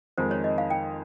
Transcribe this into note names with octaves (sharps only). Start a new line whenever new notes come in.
F2 D#3 G#3 D#4 C5
C#5
D#5
F5
G5